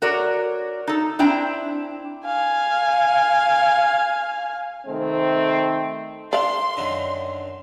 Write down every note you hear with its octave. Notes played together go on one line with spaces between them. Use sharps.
F#4 A#4 C#5 D5
D#4 A4
C4 D4 E4 G5 A#5
F5 G#5
C3 D#3 A3 C4
D4 D5 F5 C6
F#2 D3 D#3